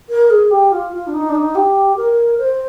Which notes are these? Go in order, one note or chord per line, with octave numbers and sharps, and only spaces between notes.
A#4
G#4
G4
F4
F4
D4
D#4
D4
D#4
G4
A#4
C5